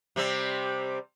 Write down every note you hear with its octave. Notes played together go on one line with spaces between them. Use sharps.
C3 G3 C4